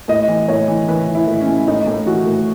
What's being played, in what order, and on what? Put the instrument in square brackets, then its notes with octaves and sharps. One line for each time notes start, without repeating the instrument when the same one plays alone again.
[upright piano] A2 D#5
E3
A2 C#5
E3
E3 B4
E3
E4
A2
C#4
A2
A2 D#4
A2
E3 F#4
A2